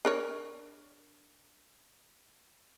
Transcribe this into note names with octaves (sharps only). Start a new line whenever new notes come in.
D4 A#4 C#5